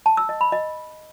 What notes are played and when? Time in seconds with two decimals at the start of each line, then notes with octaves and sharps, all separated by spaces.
0.06 A5
0.17 E6
0.29 D#5
0.41 B5
0.52 D#5